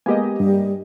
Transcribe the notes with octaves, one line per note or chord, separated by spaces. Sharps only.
G#3 A#3 B3 G4 D#5 G#5
G2 G3